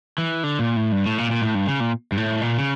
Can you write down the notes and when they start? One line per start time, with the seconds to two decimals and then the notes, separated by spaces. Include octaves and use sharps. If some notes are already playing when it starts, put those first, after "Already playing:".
0.18 E3
0.44 D3
0.59 A#2
0.76 A2
0.92 G2
1.06 A2
1.18 A#2
1.31 A#2
1.42 A2
1.55 G2
1.67 C#3
1.80 A#2
2.12 G2
2.17 A2
2.41 A#2
2.58 C#3